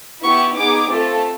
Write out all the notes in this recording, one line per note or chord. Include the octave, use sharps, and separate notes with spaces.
B3 E4 G4 C#6
B3 D#4 G#4 D6
A3 C4 F4 A4